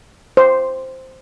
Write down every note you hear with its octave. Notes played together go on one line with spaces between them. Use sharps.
C5